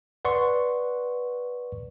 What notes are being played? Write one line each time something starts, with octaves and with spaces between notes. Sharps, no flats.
B4 D5 F#5 C6 C#6